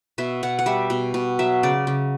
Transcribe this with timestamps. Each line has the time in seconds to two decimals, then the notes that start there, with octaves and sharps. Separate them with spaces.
0.18 B2 E5
0.43 B2 F#5
0.59 F#5
0.66 G3 E5
0.90 B2
1.14 B2
1.39 F#3 E5
1.63 C#3 D5
1.87 C#3